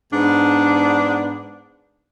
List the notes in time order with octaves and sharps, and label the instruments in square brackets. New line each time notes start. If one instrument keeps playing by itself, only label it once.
[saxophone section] G#2 B3 D4